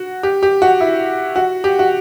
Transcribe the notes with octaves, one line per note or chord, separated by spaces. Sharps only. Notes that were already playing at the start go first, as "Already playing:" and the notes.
Already playing: F#4
G4
G4
F#4
E4
F#4
G4
F#4